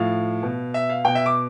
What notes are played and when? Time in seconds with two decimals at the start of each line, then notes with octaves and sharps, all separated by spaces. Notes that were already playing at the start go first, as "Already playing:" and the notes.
Already playing: A2 F3 F5
0.43 B2
0.74 E5
0.89 F5
1.05 B2 G5
1.15 E5
1.26 D6